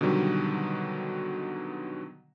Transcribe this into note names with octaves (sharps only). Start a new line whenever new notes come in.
B2 D3 D#3 F#3 G3